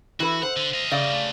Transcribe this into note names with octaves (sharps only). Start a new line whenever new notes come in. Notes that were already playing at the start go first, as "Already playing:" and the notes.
E3 F#4 B4
C5 F#5
D3
D#5 F5
C#3 G3 D5 D#5 F5
D3 A3